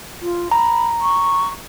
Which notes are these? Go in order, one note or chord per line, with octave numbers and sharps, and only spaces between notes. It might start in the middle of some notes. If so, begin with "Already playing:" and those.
F4
A#5 B5
C#6